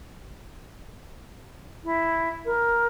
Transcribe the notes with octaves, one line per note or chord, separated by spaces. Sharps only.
E4
A#4